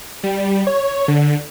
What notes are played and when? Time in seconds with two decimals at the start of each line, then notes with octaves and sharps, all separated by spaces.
0.23 G3
0.67 C#5
1.08 D3